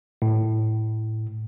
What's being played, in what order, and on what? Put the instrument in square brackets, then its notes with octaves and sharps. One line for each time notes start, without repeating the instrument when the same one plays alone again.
[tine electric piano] A2